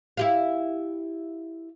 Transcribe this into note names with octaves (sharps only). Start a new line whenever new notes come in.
E4 G4 F5